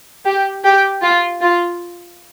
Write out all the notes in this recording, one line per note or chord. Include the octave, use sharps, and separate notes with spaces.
G4
G4
F4
F4